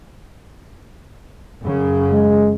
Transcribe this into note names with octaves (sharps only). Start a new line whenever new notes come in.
F#2 C#3
G#3